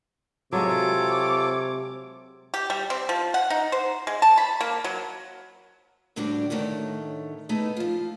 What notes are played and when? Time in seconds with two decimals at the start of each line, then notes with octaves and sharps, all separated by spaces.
0.52 C3 F#3 G#3 F4 A4 C#5 D6
2.54 G4
2.70 G3
2.90 C4
3.09 F3
3.34 F#5
3.50 D#4
3.72 C5
4.07 G#3
4.22 A5
4.38 B5
4.61 A#3
4.84 F#3
6.16 D2 A2 G3 D4 F#4 G4
6.50 A2 D3 D#3 A3 C#5
7.49 A3 B3 D#4 E4 G#4
7.77 F3 F4